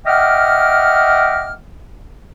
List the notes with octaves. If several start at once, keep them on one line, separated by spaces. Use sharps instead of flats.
D#5 E5 F#5 G5 D6 F6